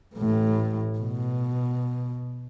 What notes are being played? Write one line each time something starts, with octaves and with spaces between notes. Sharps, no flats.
A1 A2
B2